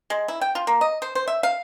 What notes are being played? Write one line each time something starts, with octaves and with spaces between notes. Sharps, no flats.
G#3
E4
G5
F4
A#3
D#5
C5
C5
E5
F5